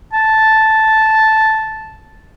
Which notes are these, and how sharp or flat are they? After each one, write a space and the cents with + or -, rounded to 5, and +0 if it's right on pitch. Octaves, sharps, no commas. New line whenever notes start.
A5 -5